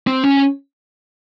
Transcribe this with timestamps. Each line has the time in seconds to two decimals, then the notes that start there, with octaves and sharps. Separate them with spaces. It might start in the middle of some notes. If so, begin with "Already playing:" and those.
0.07 C4
0.24 C#4